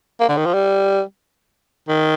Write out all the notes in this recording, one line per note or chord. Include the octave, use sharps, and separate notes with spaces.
A#3
D3
D#3
F3
G3
D#3